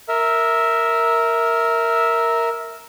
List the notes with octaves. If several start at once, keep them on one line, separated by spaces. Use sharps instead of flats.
A#4 E5